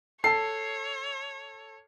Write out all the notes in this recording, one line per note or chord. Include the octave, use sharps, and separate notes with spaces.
A4 C#5 A5 C7